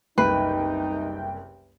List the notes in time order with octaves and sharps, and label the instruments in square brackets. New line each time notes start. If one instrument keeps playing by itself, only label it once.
[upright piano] F#1 C2 [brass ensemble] D#4 [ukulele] B4 [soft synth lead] G5